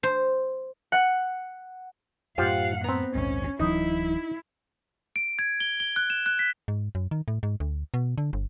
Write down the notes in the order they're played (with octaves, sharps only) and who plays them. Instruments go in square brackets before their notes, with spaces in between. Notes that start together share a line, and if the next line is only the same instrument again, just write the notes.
[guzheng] C5
[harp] F#5
[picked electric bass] F#2 A2 [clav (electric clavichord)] F4 G4 C5 [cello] F5 F#5
[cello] B3 [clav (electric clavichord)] C4 A#5
[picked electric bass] A#1 D#2 G#2 [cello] C#4
[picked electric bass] D1 E3 F#3 [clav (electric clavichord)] D#4 [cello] E4
[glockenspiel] D7
G#6
G7
G7
F#6
E7
F#6
B6
[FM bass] G#2
F#2
D#3
A2
G#2
D2
B2
D3
G1